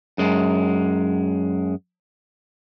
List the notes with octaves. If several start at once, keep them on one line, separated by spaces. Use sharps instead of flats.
F#2 G#3